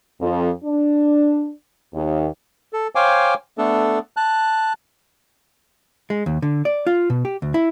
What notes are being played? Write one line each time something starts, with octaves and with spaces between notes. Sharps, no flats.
F2
D4
D#2
A4
C5 C#5 F5 G5 G#5 D6
A3 B3 D4 A4
A5 F#6
G#3
D#2
D3
D5
F4
B2
G4
D2
E4